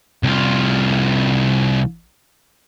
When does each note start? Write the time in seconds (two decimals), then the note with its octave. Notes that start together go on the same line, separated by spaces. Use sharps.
0.23 C2 F4